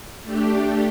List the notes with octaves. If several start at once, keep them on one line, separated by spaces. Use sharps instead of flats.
A3 D4 G4